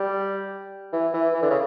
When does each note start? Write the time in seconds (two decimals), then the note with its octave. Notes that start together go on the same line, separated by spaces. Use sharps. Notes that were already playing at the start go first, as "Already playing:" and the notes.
Already playing: G3
0.93 E3
1.14 E3
1.34 E3
1.42 D3
1.50 C#3